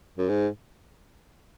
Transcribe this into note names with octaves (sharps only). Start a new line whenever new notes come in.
F#2
G#2